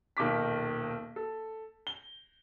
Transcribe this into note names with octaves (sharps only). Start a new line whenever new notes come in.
D#1 B1 D#3 D6 B6
A4
G7